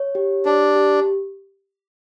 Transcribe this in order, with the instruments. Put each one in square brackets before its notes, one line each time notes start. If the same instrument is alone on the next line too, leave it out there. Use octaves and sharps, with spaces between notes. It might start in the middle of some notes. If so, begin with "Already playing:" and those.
Already playing: [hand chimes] C#5
G4
[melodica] D4 [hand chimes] G4
[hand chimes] G4